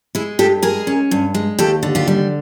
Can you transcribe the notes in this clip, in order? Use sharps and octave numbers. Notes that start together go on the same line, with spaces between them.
G#3 E4
G2 G4 A4
G#3 G#4 A#4
C#4
G2
G#3
D#2 G4 A4
D3
F4 G4
G3